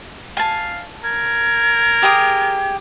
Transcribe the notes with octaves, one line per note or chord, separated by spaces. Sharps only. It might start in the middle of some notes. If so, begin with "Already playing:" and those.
F5 G#5 A5
A#4 G#6
G4 G#4 D#6